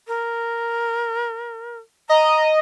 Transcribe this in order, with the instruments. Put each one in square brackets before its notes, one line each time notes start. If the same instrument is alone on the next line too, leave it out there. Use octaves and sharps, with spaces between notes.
[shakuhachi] A#4
[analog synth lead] D#5 [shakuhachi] A#5